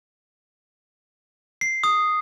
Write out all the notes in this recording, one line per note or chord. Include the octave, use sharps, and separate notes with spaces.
C7
D#6